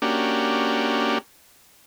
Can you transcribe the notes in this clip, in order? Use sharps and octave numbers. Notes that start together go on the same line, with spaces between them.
A#3 C#4 D4 F#4 G4